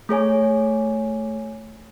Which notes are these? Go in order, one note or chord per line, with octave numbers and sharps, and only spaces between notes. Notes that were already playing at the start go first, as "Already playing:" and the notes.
A3 G#4 C#5 G#5